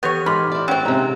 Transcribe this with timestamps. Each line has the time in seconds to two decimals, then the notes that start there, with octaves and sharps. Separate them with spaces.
0.03 E3 B3 G4 C#5 G6
0.26 G#2 B5 C6 D6 F6
0.52 E4 D5
0.68 A2 C#3 C4 C#4 C#5 G5
0.85 G#2 C3 A#5